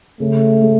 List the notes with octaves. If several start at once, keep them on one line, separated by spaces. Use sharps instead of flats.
C#3 A3
G#3